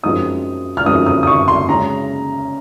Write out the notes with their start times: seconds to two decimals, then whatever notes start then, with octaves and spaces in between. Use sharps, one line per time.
0.03 F#2 F3 G#3 C4 D#4 D#6
0.77 F6
0.86 F#2 F3 G#3 C4 D#4 D#6
1.06 D#6
1.23 D#6
1.27 C#6
1.48 C6
1.69 C#3 G#3 C#4 A#5